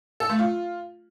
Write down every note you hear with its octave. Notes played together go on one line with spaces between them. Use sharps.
A4
A3
F4